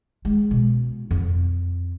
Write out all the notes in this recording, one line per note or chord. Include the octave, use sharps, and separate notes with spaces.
G#3
B2
F2